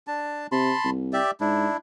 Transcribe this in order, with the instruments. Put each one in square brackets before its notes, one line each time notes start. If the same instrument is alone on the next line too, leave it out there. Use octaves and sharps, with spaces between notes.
[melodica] D4 A5
[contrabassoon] C3 [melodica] A5 B5 C6
[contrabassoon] C2
[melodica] G4 D5 E5
[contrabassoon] G#2 [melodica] D4 E4